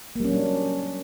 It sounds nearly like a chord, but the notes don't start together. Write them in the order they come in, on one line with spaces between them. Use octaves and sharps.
A#3 G3 C#4 F#3 D4